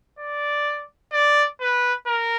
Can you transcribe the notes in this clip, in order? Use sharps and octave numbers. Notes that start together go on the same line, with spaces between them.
D5
D5
B4
A#4